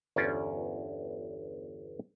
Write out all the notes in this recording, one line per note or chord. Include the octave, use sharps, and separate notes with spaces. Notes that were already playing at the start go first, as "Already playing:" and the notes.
G1 E2 C#4 F4 C5 D5